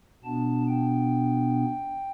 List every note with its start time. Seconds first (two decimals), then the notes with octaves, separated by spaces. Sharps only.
0.24 B2 B3 D4 A5
0.68 G5